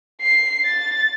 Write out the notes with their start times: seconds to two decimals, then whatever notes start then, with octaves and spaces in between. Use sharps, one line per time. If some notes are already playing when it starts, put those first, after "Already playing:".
0.21 C7
0.65 A6